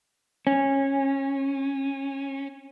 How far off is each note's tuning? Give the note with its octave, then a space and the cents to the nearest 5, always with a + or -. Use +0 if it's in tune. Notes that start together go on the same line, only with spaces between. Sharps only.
C#4 -20